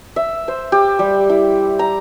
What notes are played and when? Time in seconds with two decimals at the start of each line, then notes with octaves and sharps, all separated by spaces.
0.16 E5
0.48 C5
0.72 G4
0.99 G3
1.29 E4
1.79 A#5